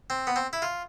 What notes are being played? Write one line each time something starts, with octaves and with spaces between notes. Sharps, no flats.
C4
B3
C4
E4
F4